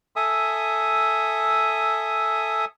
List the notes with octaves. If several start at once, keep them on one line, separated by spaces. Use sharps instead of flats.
A4 E5 G#5 D#6